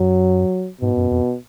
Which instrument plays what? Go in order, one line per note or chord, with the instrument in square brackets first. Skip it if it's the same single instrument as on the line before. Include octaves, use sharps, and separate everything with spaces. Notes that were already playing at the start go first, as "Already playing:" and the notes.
Already playing: [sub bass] F#2 [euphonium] F#3
[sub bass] G#2 [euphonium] B2
[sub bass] F#2
F2